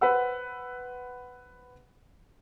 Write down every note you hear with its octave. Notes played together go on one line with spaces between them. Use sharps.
B4 C5 F#5 E6